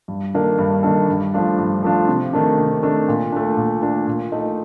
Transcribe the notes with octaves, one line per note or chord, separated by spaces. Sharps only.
G2
D#3 A#3 D4 A4
G2
D#3 A#3 D4 A4
G2
F3 A3 D4 F4
G2
F3 A3 D4 F4
C3
D#3 A3 D4
C3
D#3 A3 D4
A#2
A3 D4
A#2
A3 D4
A#2
A3 D#4